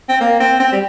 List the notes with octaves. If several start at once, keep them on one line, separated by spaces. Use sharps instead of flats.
C4
A#3
C4
C4
G3